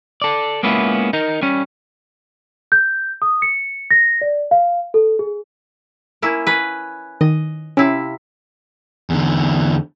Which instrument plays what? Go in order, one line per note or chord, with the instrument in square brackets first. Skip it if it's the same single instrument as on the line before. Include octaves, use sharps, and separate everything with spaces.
[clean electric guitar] A4 D5
G#3 A#3 B3 C#4 E4 F4
D#4 A#4
G3 C#4
[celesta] G6
D#6
C#7
A#6
D5
F5
A4
G#4
[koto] A#3 C#4 E4
C#4 B4
[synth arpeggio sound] D#3 [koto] D#5
[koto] C3 E4 F5 [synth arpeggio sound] C#4
[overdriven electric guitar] E2 D3